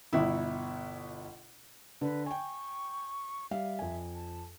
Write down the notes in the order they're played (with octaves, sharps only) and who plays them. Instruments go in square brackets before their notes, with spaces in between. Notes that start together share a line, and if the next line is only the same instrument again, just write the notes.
[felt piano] G1 B2 E4
[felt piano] D3 [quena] B4
[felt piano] G5 G#5 [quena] C#6
[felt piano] G3 F5 [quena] E5
[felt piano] F2 G#5
[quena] A5